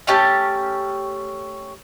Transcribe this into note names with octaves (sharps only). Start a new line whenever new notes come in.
A3 C#4 G4 A5